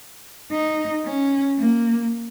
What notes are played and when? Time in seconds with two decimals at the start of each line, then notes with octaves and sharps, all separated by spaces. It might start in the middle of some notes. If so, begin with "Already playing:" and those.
0.52 D#4
1.05 C#4
1.58 A#3